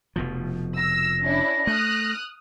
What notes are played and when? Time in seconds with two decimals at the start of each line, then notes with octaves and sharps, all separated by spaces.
0.16 F1 B2 F3
0.77 E6 A#6
1.23 C#4 D4 E4
1.67 A3 D#6 F6 F#6